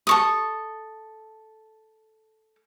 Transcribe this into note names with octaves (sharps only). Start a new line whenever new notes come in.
A4 C#6 D#6